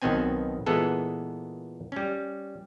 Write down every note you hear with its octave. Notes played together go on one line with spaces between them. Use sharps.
B1 B2 D#3 B3 C4 G#5
A#2 E3 G#3 B3 G#4 A4
G3 C#4